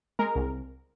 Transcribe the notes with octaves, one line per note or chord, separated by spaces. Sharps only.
G#3 A#4
C2